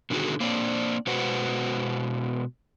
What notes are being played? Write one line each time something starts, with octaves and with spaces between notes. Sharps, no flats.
B2 D3 D#3 F#4 G#4
A#3 C4 D4 D5
B2 G#3 F#4 B4 C5 F#5